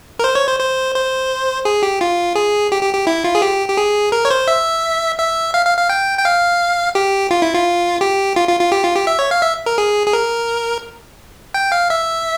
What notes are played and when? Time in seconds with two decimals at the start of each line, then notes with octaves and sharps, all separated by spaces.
0.19 A#4
0.24 C5
0.35 C#5
0.47 C5
0.60 C5
0.95 C5
1.65 G#4
1.83 G4
2.01 F4
2.35 G#4
2.72 G4
2.83 G4
2.94 G4
3.07 E4
3.24 F4
3.35 G#4
3.42 G4
3.68 G4
3.77 G#4
4.12 A#4
4.25 C#5
4.30 C5
4.48 E5
5.19 E5
5.54 F5
5.66 F5
5.77 F5
5.90 G5
6.19 G5
6.25 F5
6.95 G4
7.31 F4
7.42 E4
7.54 F4
8.01 G4
8.36 F4
8.48 F4
8.60 F4
8.72 G4
8.84 F4
8.95 G4
9.07 E5
9.19 C#5
9.31 F5
9.42 E5
9.66 A#4
9.78 G#4
10.07 G#4
10.13 A#4
11.54 G5
11.72 F5
11.90 E5